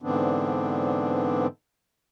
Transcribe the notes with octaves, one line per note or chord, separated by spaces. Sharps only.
G#2 D3 E3 B3 C4 D4